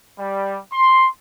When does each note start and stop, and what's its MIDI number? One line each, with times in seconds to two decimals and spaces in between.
0.18 0.58 55
0.73 1.07 84